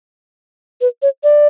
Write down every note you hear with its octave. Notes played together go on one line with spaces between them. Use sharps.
B4
C#5
D5